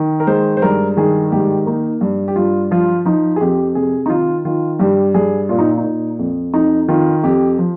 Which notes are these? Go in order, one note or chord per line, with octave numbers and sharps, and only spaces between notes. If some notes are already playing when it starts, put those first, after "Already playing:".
Already playing: D#3
A#4
G#3 C5
C5
G2 A#4
D#3 G#4
G#2 G4
A#3 D#4
G2
G4
G2 F4
F3 F4
F3 D#4
G#4
F2 G4
C3 G#4
D#4
D#3 F4
D#3 F4
G2 G4
G2 G#4
A#2 F4
D#4
D#4
A#2
F2
F2 D#4
D#3 F4
F2 G4
F3